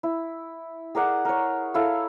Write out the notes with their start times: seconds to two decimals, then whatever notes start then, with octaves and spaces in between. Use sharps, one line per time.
0.03 E4
0.95 G#4 A#4 D5 F#5
1.25 A#4 C#5
1.74 E4 A4 C#5 F5